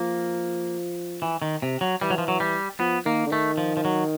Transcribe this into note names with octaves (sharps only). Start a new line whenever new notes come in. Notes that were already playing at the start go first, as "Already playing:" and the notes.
Already playing: F3 A#3
E3
D#3
C3
F#3
E3 G3
F#3
F3
F#3
G3
F3 B3
D#3 A#3
D3
D#3 A3
F3
F3
F#3